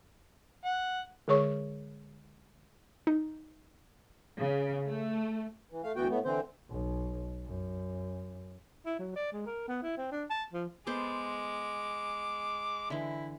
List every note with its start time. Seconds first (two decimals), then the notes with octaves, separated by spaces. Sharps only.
0.65 F#5
1.28 D3 G#3 G#4 C#5 C#6
3.07 D#4
4.38 C#3
4.87 A3
5.72 E3
5.83 A3 F5
5.96 D2 E3 B3 F#4 G5
6.10 A2 A3 B3
6.25 D3 E3 C4 C5
6.70 B1
7.45 F#2
8.86 E4
8.99 F#3
9.16 D5
9.33 G#3
9.46 A#4
9.68 B3
9.83 E4
9.97 C4
10.12 D4
10.30 A5
10.53 F3
10.87 G#3 B3 A4 C5 D6
12.90 D3 E3 E4